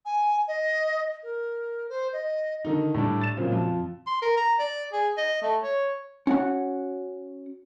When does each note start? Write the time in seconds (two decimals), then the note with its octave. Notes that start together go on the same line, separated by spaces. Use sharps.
0.05 G#5
0.48 D#5
1.23 A#4
1.89 C5
2.13 D#5
2.65 D3 D#3 D#4
2.94 A2 G3 D4
3.21 A6 E7
3.37 A#2 C#3 F#3 C4 F4
3.52 F2 F4
4.07 C6
4.22 A#4
4.37 A#5
4.59 D5
4.93 G#4
5.17 D#5
5.42 A3
5.63 C#5
6.27 C#4 F#4 F#5